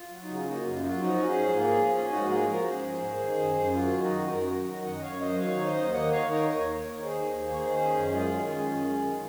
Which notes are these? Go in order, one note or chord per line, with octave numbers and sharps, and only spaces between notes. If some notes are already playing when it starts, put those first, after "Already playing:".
Already playing: F4
F#3
D#4
C#3
F4
A#3 D#4 F#4
F#2 F4
F#3 F4
F3 D#4 F#4
C#4
G#4 C5
G#2
A#3 F4 G#4
F3
C#4
G#2 D#4 F#4
A#3 F4 G#4
F3 F#4 A#4
C#4 G#4 C5
G#2
G#4 C5
A#3
D#3
F#2
F#2
F#3 F4
D#3
D#4 F#4
F#2
F#2 F#4 A#4
F#3
D#3
F#2 D#5 F#5
F#2 C#5 F5
F#3 C5 D#5
D#3 C#5 F5
D#4
C5 D#5
D#2
A#3 D#5 F#5
D#3 C#5 F5
D#4 A#4 C#5
D#2 A#4 C#5
A#3
A#4 C#5
D#3
D#4 G#4 C5
D#2
A#3
C#5
D#3 G#4 C5
C#4
F#2
G#3 F4 G#4
D#3
C#4
F#2
G#3
D#3